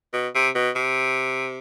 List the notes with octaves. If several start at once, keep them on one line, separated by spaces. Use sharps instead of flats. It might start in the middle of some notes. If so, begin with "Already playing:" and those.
B2
C3
B2
C3